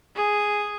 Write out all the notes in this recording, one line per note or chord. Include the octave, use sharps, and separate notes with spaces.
G#4